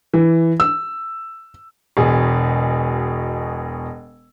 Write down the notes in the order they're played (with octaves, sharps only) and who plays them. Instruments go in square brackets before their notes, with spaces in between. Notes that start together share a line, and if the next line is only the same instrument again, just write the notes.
[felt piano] E3
E6
[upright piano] E1 B2 G#4